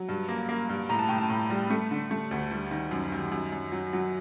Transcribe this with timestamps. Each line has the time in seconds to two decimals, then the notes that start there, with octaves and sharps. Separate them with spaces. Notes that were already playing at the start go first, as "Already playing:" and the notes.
Already playing: F#3
0.09 G2
0.29 A#3
0.49 A#3
0.69 G2
0.89 A2 A#5
0.99 A5
1.09 A2 G5
1.18 A5
1.30 A2
1.50 G3
1.70 A3
1.91 D3
2.11 A3
2.31 D2
2.51 G3
2.71 D#3
2.91 F#2
3.12 D#3
3.32 F#2
3.52 F#2
3.72 F#3
3.93 F#3